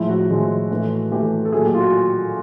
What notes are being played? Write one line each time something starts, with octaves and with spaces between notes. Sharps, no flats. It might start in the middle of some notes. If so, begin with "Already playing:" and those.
Already playing: A2 F3 G#3 E4
F#4
A2 F3 G#3
A2 E3 A3
A2 E3 A3 G4
A4
A#2 F#3 A3 G#4
G4
F4
F#4